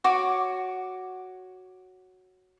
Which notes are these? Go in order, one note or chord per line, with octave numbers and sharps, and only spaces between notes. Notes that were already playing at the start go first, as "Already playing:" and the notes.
F#4 C#5 D6